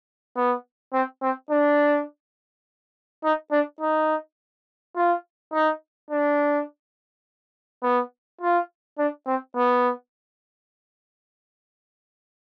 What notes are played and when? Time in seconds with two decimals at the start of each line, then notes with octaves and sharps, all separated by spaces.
0.36 B3
0.93 C4
1.22 C4
1.51 D4
3.24 D#4
3.52 D4
3.81 D#4
4.96 F4
5.53 D#4
6.11 D4
7.83 B3
8.41 F4
8.99 D4
9.27 C4
9.56 B3